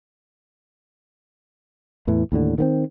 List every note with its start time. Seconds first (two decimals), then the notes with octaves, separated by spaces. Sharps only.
2.07 E2 A2 E3
2.32 D#2 A2 D3
2.58 D#3 B3 C4